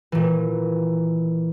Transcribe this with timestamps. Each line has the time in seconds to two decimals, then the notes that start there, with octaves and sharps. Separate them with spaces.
0.12 A#2 E3